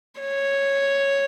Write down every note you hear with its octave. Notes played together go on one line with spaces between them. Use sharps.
C#5